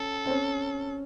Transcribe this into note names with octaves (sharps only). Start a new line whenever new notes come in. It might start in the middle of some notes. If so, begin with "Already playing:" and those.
Already playing: C#4 A4
C4
C#4